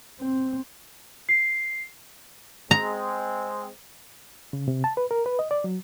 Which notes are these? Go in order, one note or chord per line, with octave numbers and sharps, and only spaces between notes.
C4
C7
G#3 C4 A#5
C#3
C3
A5
B4
A#4
B4
D#5
D5
F#3